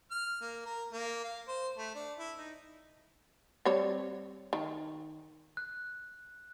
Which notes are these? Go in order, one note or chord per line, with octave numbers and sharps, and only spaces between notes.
F6
A#3
A#4
A#3
F5
C5
A3
D4
E4
D#4
G3 C4 C#5
D#3
F#6